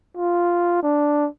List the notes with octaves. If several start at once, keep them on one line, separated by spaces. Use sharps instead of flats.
F4
D4